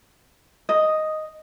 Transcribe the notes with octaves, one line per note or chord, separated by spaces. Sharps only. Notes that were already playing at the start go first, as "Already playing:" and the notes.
D#5